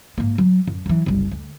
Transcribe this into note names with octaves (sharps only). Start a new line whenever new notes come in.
G#2 A#3
F#3
F#2
E3 F#3
F#1 C2
D2